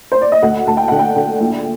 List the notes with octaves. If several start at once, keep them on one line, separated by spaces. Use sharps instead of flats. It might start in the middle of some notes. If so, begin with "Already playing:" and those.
C5
D5
D#5
D2 F#5
D2 A5
G5
D3 F#5
G5
D3
A#1